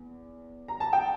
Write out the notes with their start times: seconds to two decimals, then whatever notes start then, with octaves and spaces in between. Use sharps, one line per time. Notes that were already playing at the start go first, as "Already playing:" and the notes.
Already playing: E2
0.68 A#5
0.80 A5
0.93 G5